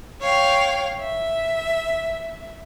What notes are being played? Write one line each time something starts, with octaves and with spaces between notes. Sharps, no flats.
C#5 F5 G5
E5